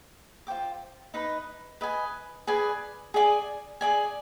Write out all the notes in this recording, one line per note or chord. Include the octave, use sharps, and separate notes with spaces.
F4 C5 G5 D6
D#4 B4 D#5
B4 D#5 G#5
G#4 B4 D5 G#5
G#4 D5 G#5
G#4 D5 G#5